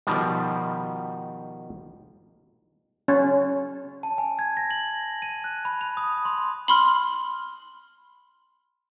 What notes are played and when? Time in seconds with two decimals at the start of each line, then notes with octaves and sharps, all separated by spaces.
0.07 B2 D#3 F3 G3
3.08 C#4
4.03 A5
4.18 G#5
4.39 G#6
4.57 A#6
4.71 F#7
5.22 D#7
5.44 F#6
5.65 B5
5.81 F7
5.97 D#6
6.25 C6
6.68 B5 C6 F6